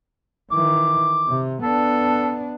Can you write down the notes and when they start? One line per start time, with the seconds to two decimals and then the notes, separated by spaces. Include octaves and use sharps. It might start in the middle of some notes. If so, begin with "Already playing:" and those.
0.52 D#3 E3 D6
1.29 C3
1.63 B3 D4 A4